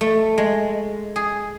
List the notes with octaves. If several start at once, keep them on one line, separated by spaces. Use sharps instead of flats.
A3
G#3
G#4